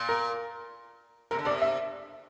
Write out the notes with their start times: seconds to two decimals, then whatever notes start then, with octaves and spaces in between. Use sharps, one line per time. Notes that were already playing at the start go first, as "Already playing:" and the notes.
Already playing: A#2
0.09 A#4
1.31 C3 A#4
1.38 D3
1.45 C3 D5
1.62 E5